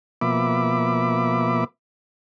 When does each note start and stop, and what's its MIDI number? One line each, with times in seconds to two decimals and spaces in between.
0.21 1.64 47
0.21 1.64 53
0.21 1.64 58
0.21 1.64 76
0.21 1.64 83
0.21 1.64 86